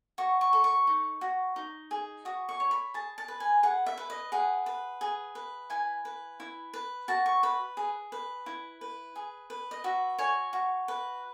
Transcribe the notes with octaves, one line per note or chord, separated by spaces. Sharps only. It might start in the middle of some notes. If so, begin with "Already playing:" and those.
F#4 C#6
C#6
A4
C#6
D#4
F#4
D#4
G#4
F#4 D#6
C#6
C#5
B5
G#4 A5
A5
B4
G#5
G#4 F#5
E5
B4
D#5
G#4 F#5
B4
G#4
B4
E4 G#5
B4
E4
B4
F#4 A5
C#6
B4 B5
G#4
B4
E4
B4
G#4
B4
D#5
F#4 E5
C#5 G#5
F#4
B4